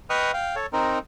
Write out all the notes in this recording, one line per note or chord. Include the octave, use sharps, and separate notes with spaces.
B4 D#5 G5 C#6 D#6 F6
F5 G5
A4 C#5
C4 D#4 A#4